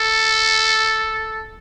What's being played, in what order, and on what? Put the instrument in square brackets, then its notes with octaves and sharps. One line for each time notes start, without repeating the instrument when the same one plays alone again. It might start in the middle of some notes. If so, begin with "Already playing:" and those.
Already playing: [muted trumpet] A4